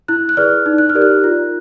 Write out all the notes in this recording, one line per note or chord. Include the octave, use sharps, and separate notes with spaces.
E4 F#6
F#6
G#4 B4 D5 F6
D#4
F#6
F6
G4 A#4 D5
F#6
F4